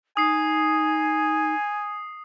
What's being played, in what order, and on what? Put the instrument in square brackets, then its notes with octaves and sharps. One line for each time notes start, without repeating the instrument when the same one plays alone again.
[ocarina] D#4 [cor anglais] G#5 [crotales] D#6 C7